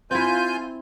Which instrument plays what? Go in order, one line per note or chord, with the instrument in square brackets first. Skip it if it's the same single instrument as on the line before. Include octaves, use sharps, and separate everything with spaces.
[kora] C4 E4 [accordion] F4 G#5 G6